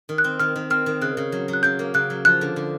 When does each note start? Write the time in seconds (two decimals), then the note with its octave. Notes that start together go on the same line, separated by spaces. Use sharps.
0.09 D#3
0.18 F#6
0.24 C4
0.40 D#3 F6
0.56 D#3
0.70 C4 F6
0.86 D#3
1.01 C#3 F#6
1.17 C#3
1.32 F#3
1.48 F#3
1.53 F#6
1.63 C#3 G6
1.79 A#3
1.94 C#3 F#6
2.10 F#3
2.25 F3 F#6
2.41 D3
2.56 D3